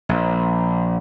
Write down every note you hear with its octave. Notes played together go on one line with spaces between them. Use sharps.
A#1